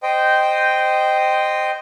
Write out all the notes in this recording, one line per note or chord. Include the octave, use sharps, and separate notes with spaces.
C5 D#5 G5